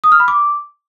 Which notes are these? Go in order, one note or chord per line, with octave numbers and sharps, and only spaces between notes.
D#6
F6
B5
D6